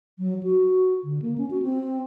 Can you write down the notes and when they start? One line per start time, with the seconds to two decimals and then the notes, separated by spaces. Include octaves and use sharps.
0.19 F#3
0.43 F#4
1.04 D3
1.22 A#3
1.38 C#4
1.51 F#4
1.62 C4